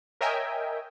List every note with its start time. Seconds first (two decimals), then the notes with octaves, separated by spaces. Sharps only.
0.21 A#4 C#5 D#5 E5 G5 G#5